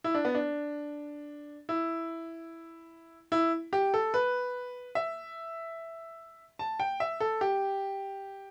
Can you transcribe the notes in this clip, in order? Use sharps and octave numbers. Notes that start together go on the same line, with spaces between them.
E4
D4
B3
D4
E4
E4
G4
A4
B4
E5
A5
G5
E5
A4
G4